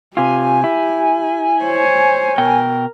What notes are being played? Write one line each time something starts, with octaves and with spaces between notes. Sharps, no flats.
C3 F4 G4 G#5
E4
C5 C#5
B2 A#4 G5